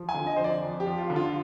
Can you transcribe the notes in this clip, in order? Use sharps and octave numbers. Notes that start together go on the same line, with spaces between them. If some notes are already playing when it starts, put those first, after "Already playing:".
Already playing: F3
G#5
D3
D#5
F2 C5
D5
F2
G4
F3
F4
D3
F4